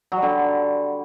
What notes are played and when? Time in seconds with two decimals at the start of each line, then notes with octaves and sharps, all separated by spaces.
0.12 F#3
0.17 G3
0.22 D3